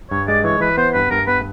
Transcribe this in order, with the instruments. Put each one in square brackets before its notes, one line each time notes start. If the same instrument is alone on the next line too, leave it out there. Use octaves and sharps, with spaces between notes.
[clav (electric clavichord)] G2 [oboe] C#5
[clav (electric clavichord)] G#3 [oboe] D5
[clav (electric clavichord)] E3 [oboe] C#5
[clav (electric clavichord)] E3 [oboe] B4
[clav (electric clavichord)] B3 [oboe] C5
[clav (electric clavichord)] G2 [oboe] B4
[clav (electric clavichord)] G2 [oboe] A#4
[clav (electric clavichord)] B3 [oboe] B4